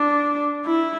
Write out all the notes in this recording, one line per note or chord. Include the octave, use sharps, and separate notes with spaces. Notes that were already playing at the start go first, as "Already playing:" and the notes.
Already playing: D4
E4